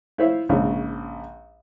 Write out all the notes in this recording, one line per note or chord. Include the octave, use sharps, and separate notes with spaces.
E4 F4 C5 C#5 E5
A#1 G#2 C#3 F3 C#5